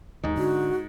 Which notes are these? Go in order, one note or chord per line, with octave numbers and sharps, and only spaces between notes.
D#2 G#2 D#3
D3 F#4